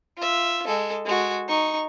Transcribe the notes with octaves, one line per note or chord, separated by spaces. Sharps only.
F4 E5
G#3 A4
G#3 F#4
D#4 C#6